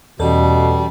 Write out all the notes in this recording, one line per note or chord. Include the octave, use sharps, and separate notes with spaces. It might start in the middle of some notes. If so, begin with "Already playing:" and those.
E2 B2 E3 G3 C#4 A4